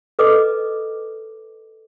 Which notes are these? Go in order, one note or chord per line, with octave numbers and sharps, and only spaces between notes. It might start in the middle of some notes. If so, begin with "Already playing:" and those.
A4 B4 D#5 D6